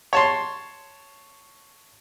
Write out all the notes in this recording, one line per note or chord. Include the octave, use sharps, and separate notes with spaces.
C#5 A5 C6